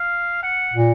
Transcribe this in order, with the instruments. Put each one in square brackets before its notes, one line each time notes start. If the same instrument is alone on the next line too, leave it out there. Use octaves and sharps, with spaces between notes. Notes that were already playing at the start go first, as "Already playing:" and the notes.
Already playing: [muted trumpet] F5
F#5
[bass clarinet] A#2